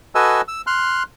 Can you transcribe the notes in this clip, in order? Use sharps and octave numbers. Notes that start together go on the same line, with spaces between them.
F#4 A4 B4 D#5 G#5 E6
E6
C6 F6 F#6